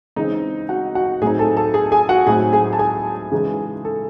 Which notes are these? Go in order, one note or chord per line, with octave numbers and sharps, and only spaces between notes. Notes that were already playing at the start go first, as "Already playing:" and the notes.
C#3 E3 G#3 C4 D#4 D#5
F#4 F#5
F#4 F#5
A2 F#3 C4 D#4 G#4 G#5
A4 A5
A4 A5
G#4 G#5
G#4 G#5
F#4 F#5
A2 F#3 C4 D#4 G#4 G#5
G#4 G#5
A5
G#4 G#5
C#3 E3 G#3 D#4
A4